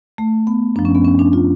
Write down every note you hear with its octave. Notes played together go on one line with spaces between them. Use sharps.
A3
B3
F#2 F3 D4
C#4
B3
C#4
D4
F4